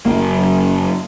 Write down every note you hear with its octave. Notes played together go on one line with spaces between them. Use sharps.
F#1 D#2 A#3